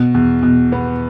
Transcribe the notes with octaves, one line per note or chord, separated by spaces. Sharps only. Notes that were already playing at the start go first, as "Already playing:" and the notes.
Already playing: B2
E2
B2
B3